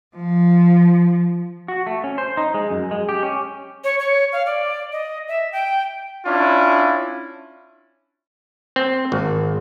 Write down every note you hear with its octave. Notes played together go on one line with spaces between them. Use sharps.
F3
F#4
A3
C#4
C5
D#4
G#3
F#2
G#3
G4
C#4
C#5
C#5
F5
D5
D#5
E5
G5
C#4 D4 E4 F4
C4
G#1